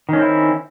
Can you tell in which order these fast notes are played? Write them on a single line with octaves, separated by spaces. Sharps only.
D#3 C#4 C4 E4